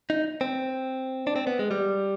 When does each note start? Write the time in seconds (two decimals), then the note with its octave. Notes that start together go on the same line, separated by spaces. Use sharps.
0.10 D#4
0.41 C4
1.27 D4
1.36 C4
1.47 B3
1.59 G#3
1.71 G3